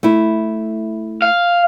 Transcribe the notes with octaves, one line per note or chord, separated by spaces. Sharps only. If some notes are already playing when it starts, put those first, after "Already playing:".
A3 E4
F5